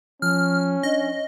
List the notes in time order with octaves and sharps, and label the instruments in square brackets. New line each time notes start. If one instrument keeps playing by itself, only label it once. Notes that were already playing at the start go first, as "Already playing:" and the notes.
[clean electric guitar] F3 [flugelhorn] C#4 [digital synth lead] F6
[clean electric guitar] D4 [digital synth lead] D#5